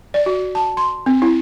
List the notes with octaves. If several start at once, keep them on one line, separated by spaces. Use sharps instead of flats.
D5
F#4
A5
C6
C4
E4